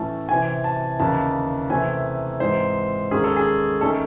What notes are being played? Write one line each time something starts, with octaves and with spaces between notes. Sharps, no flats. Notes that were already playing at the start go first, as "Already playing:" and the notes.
Already playing: A2 E3 A3 C#4 A5
C3 E3 C4 G#5
A5
D#2 C#3 E3 A5
C3 E3 A3 C4 G#5
G#2 E3 G#3 C4 C5
D#2 D#3 G#3 C#4 G#4
A4
G#4
D#3 A3 C#4 A4